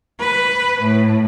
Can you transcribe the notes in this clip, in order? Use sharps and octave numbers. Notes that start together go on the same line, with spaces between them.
B4
A2